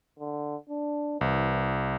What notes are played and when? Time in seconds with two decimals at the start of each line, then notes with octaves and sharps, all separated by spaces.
0.19 D3
0.70 D4
1.21 C2 E3